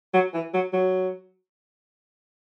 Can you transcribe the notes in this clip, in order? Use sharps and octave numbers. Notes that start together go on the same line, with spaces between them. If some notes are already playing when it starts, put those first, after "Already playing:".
F#3
E3
F#3
F#3